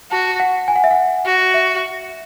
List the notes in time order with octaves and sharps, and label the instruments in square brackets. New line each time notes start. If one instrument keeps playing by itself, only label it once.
[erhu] F#4 [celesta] A5
[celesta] F#5
G#5
F#5
E5
F#5
[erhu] F#4
[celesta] E5